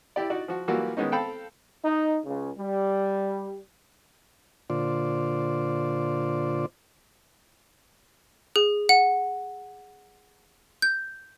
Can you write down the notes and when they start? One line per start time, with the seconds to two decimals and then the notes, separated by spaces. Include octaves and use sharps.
0.16 E4 G4 D5
0.30 D#4 F#4 D5
0.48 F3 F#4
0.68 E3 F#3 G3 A#3 F4 F#4
0.97 D#3 G#3 B3 C#4 D#4
1.12 C4 A4 F5 G5 A5 B5
1.84 D#4
2.26 C#2 C#3
2.57 G3
4.70 A#2 D3 F4 C5 D5
8.56 G#4
8.89 F#5
10.82 G6